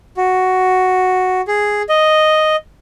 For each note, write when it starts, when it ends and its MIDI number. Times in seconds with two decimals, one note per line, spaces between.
0.17 1.41 66
1.48 1.82 68
1.89 2.56 75